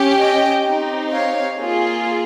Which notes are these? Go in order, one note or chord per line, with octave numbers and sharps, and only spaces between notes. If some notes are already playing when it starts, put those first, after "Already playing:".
Already playing: C#4 G4
D#5 G5
C4 D#4 G4
C#5 F5
A#3 F4 G#4